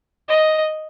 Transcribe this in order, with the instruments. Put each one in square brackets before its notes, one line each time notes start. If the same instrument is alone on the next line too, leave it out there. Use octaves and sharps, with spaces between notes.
[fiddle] D#5